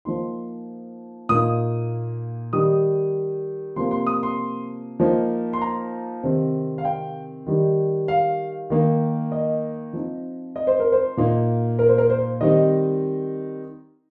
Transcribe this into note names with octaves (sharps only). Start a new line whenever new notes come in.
F3 A#3 D#4 C6
A#2 A#3 D#4 D#6
D#3 G3 D#4 D#6
C3 F3 A#3 C6
C6
D#6
C6
F3 A#3 D#4
C6
A#5
C3 D#3 C4 D#4
F5
G5
D#3 G3 D#4
F5
D#3 A#3 D#4
D#5
F3 C4 D#4
D#5
C5
A#4
C5
A#2 A#3 D#4
A#4
C5
A#4
C5
D#3 G3 C4 D#4 D#5